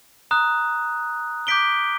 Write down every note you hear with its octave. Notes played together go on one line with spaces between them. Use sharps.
A#5 D#6 F#6
D6 G6 B6 D7 G7